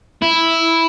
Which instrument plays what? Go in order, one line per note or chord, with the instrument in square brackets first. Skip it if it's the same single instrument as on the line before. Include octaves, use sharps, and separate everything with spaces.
[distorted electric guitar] E4